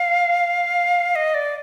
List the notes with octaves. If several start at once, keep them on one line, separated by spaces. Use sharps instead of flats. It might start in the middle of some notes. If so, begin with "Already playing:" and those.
Already playing: F5
D#5
D5